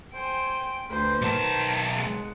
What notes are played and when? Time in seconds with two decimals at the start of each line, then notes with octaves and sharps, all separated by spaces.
0.14 C5 G5 G#5
0.89 D2 B4 C5
1.22 B1 D#3 A5
1.93 G#3 F#5